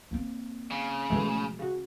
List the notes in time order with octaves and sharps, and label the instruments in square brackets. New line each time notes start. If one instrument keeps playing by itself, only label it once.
[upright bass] A#3 C4
[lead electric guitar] C#3
[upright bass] B2 F3 [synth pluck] E3 G#3 A3
[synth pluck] C#3 F#4